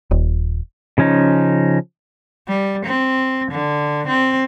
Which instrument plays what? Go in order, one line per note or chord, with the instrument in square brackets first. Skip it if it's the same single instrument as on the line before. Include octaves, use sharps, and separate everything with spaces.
[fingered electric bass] D#1
[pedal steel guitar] C#3 F3 C#4 D#4
[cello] G3
C4
D3
C4